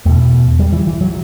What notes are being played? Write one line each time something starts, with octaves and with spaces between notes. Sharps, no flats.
E2 B2 A3
G3
E3
E3
F#3